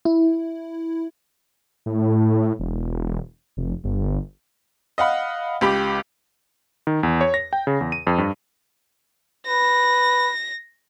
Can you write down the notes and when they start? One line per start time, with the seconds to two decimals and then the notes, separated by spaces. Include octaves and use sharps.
0.05 E4
1.86 A2
2.59 E1
3.57 F1
3.84 G1
4.98 D#5 F5 F#5 B5
5.61 C#2 G4 B5 D6
6.87 D#3
7.03 E2
7.21 C#5
7.34 A#6
7.53 G5
7.67 C#3
7.81 E2
7.92 D#7
8.07 F2
8.18 G2
9.47 B4 A#6